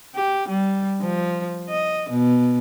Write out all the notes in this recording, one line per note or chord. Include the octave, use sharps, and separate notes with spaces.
G4
G3
F3
D#5
B2